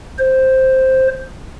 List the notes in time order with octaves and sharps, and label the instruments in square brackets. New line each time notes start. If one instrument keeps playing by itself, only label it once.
[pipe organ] C5